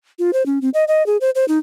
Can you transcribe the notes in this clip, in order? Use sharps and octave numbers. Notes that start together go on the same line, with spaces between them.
F4
C5
C#4
C4
D#5
D#5
G#4
C5
C5
D#4